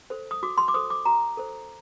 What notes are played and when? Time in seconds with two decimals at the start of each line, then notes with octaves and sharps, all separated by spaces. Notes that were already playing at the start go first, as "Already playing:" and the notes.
0.10 A4 C5
0.31 D#6
0.43 F#4 D6
0.58 C6
0.68 D6
0.74 A4 C5 D#6
0.90 D6
1.05 F#4 A#5
1.37 A4 C5